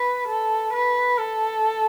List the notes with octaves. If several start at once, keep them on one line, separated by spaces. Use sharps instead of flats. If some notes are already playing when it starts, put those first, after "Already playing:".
Already playing: B4
A4
B4
A4